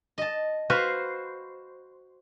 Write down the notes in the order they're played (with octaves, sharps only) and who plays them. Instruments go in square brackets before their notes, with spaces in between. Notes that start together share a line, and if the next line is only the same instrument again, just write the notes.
[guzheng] D#5 A5
[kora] F#4 B4 F5 [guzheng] C5